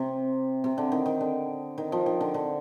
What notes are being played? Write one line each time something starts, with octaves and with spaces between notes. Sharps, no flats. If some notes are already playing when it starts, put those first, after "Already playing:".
Already playing: C3
C3
D3
D#3
D#3
D3
D#3
F3
D#3
D3
D3